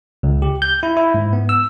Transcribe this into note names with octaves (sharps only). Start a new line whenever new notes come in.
C#2
G4
G6
E4
E4
G#2
B3
E6